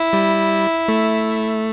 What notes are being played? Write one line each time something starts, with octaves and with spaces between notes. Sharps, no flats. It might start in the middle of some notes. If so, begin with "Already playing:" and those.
Already playing: E4
G3
A3